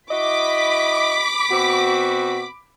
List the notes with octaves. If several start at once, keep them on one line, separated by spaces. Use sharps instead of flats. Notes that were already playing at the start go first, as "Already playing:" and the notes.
E4 F#4 D#5 B5 D6 B6
B2 C4 F#4